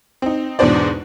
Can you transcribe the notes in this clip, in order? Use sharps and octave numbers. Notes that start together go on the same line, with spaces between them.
C4 D#4
E2 G#2 B2 D4 C5 D5